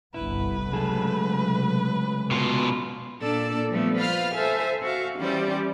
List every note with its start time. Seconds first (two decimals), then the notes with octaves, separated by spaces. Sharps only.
0.14 G1 C2 B3 E4 B4
0.72 C#2 C3 F#3 A3 G#4 A4
2.31 B2 F4
3.20 A#2 A#3 D4 A4 D5 E6
3.69 F3 G3 A3 B3
3.97 F4 B4 C5 F5 F6
4.32 A4 C5 E5 G#5
4.82 F#4 E5 F5
5.18 E3 G3 C#4 C5 D5